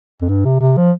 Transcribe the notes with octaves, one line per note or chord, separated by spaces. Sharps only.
F2
G2
C3
C3
F3